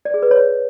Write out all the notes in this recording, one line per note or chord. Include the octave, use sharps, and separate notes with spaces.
D5
G#4
B4
C#5